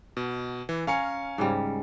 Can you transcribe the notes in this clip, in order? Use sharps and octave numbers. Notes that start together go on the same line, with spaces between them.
B2
E3
C#4 A#4 F5 G#5 C#7
G#2 C#3 G3